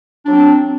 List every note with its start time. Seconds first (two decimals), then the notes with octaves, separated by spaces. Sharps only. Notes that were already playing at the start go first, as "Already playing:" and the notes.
0.24 D4
0.28 F#3
0.32 C4